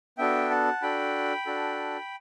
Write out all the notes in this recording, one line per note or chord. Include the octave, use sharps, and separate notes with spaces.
B3 D4 F#4 A4 E5 G5
F#5 A5
D4 F#4 A4 G5 B5
D4 F#4 A4